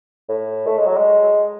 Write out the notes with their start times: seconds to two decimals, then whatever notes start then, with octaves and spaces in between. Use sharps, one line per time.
0.29 A2
0.67 A3
0.78 G#3
0.87 F#3
0.97 G#3